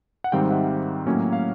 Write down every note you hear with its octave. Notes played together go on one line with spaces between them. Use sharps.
F#5
G#2 D#3 G3 C4 F5 G5
E5 F#5
A2 F#3 A#3 C#4
F5